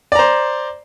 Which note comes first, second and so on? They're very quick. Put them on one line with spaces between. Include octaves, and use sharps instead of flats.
D5 A#5 C5